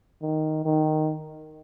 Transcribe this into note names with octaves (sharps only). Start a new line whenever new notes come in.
D#3
D#3